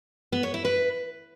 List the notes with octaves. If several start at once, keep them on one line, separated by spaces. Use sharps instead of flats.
B3
C#5
E4
B4